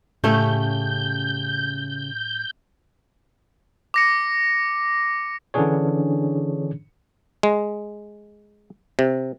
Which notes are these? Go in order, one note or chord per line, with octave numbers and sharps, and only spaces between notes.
A2 C#3 A3 C#4 G4 A4 G6
D6 A#6 C#7
D3 E3 C#4 D4 G#4 C#5
G#3
C3